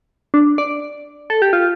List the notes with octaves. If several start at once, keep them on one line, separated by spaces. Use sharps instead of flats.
D4
D5
A4
G4
F4